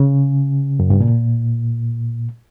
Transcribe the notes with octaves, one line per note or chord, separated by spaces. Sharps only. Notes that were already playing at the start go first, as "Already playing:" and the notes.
Already playing: C#3
F#2
G2
A#2